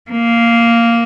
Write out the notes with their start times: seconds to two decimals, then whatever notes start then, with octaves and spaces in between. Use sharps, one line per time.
0.10 A#3